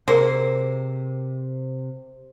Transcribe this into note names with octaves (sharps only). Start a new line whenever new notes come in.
C3 A#3 G#4 A#4 C5